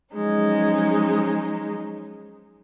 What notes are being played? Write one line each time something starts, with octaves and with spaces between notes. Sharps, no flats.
F3 F#3 G#3 C#4 D#4